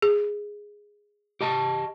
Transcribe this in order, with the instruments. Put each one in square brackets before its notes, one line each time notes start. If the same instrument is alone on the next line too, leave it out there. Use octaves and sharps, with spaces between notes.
[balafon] G#4
[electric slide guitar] G4 D#5 A5